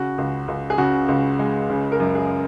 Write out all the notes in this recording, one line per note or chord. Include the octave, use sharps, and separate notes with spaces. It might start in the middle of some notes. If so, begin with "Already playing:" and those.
Already playing: C#3 F#4
C#2
C#2
G#4
C#3 F#4
C#2
G#3
C#3
A#4
F#2
G#4